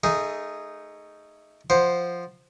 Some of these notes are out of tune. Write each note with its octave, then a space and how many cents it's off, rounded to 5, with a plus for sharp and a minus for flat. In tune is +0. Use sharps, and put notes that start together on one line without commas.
A3 +20 D#4 +0 G#4 -5
F3 +0 C5 +0 F#5 +0